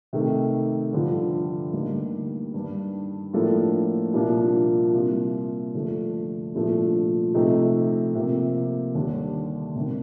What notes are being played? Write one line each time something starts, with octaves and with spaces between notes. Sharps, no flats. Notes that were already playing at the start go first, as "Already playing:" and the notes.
C3 D#3 A3
G2 D3 F3
D2 D3 G3 A#3 D#4
G2 D#3 G3 D4
A2 F3 A#3 D4 A4
C2 A#2 F3 A#3 D4
C2 C3 G3 A#3 F4
G2 D3 F3 A3 D4
C2 A#2 F3 A3 D4
C3 F3 A3 D#4
C3 F3 A#3
D#2 D3 G3 D4
D2 C3 D#3 A#3 D4